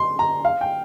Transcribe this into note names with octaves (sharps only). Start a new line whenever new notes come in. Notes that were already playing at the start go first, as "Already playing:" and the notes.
Already playing: C6
A#5
F5
G5